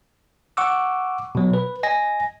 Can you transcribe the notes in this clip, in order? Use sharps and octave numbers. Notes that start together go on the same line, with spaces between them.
F#5 C#6 D6 E6
B2 F#3
B4
D#5 G#5 A#6